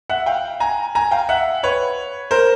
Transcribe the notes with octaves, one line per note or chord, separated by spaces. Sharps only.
E5 F#5
F5 G5
G#5 A#5
G#5 A#5
F5 G5
E5 F#5
B4 C#5
A#4 C5